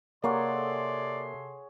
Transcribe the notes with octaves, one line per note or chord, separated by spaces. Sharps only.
C3 A#3 G#4 A4 C#5 D5 F#5 C6